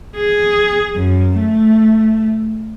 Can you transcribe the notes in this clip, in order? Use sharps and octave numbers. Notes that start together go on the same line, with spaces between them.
G#4
F#2
A3